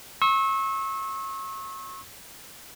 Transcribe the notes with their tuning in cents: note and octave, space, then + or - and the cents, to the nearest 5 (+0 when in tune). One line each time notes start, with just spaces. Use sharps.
C#6 -35 E6 -30